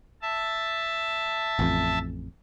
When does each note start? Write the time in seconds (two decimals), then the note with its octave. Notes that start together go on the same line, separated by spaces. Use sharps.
0.22 E5 A5
1.59 A1 F2